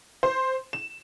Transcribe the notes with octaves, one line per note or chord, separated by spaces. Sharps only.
C5
E7